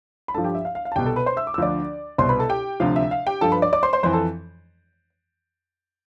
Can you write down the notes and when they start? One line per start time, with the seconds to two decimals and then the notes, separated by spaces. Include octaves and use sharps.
0.28 B5
0.34 G2 F3 A4 A5
0.44 G4 G5
0.55 E5
0.65 F5
0.75 F5
0.85 F5
0.92 A5
0.96 C2 B2 G4 G5
1.06 A4 A5
1.16 B4 B5
1.26 C5 C6
1.37 E5 E6
1.47 D6
1.54 E6
1.58 D2 D3 F3 D5 D6
2.18 C2 B2 C5 C6
2.29 B4 B5
2.39 A4 A5
2.49 G4 G5
2.80 D2 C3 F3 F5
2.96 E5
3.11 F5
3.27 G4 G5
3.41 G2 F3 A4 A5
3.52 B4 B5
3.62 D5 D6
3.73 D5 D6
3.83 C5 C6
3.93 C5 C6
4.03 F2 E3 C5 C6
4.13 A4 A5